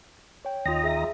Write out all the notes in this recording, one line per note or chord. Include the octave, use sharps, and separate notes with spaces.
C#5 G5
D#2 F4 D#5 G5 A#5
G#4 E5